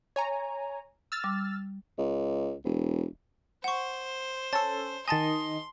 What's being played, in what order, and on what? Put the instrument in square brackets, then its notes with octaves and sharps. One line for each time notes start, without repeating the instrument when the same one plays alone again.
[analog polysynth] C#5 G#5 A#5
E6 F6 A6
[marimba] G3 D6
[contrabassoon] C#2
E1
[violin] C5 [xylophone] F#5 C#6
[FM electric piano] C#4 A4 [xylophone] A5 A6
[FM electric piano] D#3 D#5 [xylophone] G#5 A5 A6 [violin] C6